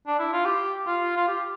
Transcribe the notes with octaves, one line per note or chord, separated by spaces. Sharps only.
D4
E4
F4
G4
F4
F4
G4